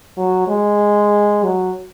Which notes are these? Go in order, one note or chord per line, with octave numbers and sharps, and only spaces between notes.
F#3
G#3
F#3